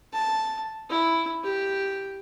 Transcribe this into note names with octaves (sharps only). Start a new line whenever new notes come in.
A5
E4
G4